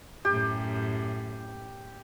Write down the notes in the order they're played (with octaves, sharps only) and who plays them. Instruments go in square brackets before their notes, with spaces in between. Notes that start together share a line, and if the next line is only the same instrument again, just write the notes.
[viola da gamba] F#2 A2 [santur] G4